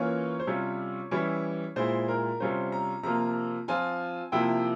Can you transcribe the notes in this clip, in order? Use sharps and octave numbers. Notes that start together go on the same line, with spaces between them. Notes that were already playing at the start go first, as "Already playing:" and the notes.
Already playing: E3 A#3 C#4 F4 C#5
C5
C3 G3 C#4 F4 C#5
E3 G3 C#4 E4
A#2 G#3 E4 C5
A#4
C3 G3 C#4 F4 C5
A#5
C3 F3 A#3 F4 A#5
F3 C4 F4 G#5
C3 F3 A#3 E4 G5